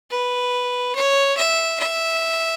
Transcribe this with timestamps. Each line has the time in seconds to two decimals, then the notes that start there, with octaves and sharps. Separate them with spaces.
0.11 B4
0.95 C#5
1.37 E5
1.79 E5